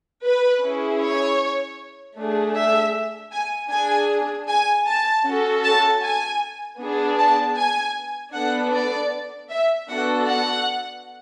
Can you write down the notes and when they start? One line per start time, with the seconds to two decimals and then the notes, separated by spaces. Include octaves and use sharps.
0.23 B4
0.61 C#4 E4 G#4
1.00 C#5
2.16 A3 D4 G#4
2.54 E5
3.31 G#5
3.70 D4 G#4 G#5
4.48 G#5
4.86 A5
5.24 C#4 F#4 A4
5.63 A5
6.02 G#5
6.79 B3 D4 G#4
7.17 A5
7.57 G#5
8.33 B3 D4 A4 F#5
8.72 D5
9.50 E5
9.88 B3 D4 F#4 A4 F#5
10.27 F#5